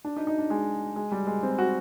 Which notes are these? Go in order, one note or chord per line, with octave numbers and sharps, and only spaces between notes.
D4
D#4
D#4
D4
G#3
G#3
G3
G#3
C4
F#4